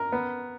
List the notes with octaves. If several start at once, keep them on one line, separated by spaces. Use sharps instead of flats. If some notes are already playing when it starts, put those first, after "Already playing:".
Already playing: A#4
B3